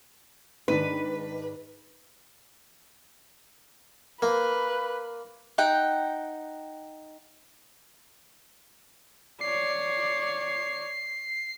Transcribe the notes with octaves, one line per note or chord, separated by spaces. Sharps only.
G#2 D#3 D4 B4
A#3 B4
D#4 F#5 G5
C#5 D5 C7